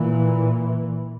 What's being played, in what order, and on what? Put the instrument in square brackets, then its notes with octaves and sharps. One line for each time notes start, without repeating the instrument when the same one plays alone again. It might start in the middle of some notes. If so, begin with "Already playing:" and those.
Already playing: [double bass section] A#2 E3